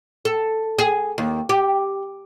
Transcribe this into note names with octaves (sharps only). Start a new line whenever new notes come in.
A4
G#4
D#2
G4